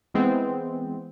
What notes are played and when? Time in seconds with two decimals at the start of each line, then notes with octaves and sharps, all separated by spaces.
0.14 E3 G#3 B3 C4